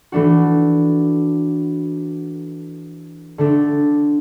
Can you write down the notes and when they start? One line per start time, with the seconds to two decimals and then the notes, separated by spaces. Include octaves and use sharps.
0.12 E3 A3 D4 F#4
3.38 D3 A3 D4